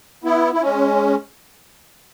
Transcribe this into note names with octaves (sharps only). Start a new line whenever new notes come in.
B3 E4
E4
G#3 C#4